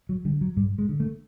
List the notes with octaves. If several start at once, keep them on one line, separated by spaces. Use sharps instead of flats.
F#3
D3 G3
F#3
G2 G3
G#3
D3
A3